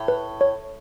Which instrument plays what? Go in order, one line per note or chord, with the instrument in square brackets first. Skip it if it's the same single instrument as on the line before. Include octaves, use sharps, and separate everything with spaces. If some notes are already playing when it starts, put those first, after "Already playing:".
Already playing: [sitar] A2
[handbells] B4
C#5